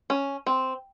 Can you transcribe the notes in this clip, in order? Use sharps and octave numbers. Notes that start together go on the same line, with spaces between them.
C#4
C4